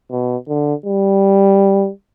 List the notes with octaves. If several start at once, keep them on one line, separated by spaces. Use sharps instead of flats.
B2
D3
G3